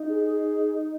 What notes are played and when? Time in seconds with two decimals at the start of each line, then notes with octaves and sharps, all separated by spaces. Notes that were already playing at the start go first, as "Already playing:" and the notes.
Already playing: D#4
0.09 G#4
0.25 G#4